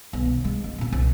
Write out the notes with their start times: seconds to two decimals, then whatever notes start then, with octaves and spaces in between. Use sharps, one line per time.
0.13 B1
0.25 D#3
0.44 G#3
0.64 C#2
0.78 A#2 C4
0.92 C2